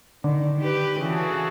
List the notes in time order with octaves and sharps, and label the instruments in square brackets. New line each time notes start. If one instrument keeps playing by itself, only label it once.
[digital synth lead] D3 [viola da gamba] D#3
[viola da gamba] G4 B4
[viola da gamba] C#3 E3 [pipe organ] F#4 G#4 A4